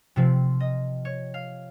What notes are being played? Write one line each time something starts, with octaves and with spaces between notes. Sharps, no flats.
C3 F3 C4
D#5
C#5
F5